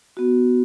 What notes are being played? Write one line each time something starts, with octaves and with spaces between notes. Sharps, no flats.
B3 F#4